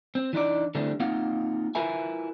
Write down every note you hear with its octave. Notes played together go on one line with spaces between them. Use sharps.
C4
E3 D4 D#4 D5
D3 E3 G3 A3 C4
A#3 C4 D#4 F4 F5 F#5
E4 F4 A#4 B4 E5 G#5